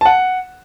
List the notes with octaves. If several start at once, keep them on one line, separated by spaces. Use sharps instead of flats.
A5
F#5